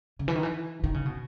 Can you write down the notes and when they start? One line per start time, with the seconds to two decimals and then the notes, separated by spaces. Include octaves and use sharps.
0.19 C#3
0.28 E3
0.35 D#3
0.43 E3
0.84 D#3
0.94 C#3
1.06 B2